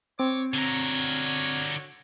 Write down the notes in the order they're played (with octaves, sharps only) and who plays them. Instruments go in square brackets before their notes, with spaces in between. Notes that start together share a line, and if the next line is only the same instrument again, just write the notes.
[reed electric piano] C4 [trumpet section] C#5 D6
[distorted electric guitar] D3 A#4 [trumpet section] F#4 C#5